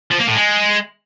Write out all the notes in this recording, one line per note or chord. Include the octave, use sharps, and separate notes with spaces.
F3
A#3
A2
G#3